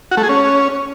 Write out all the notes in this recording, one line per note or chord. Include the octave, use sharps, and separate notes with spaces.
F#4
A3
G#4
C#4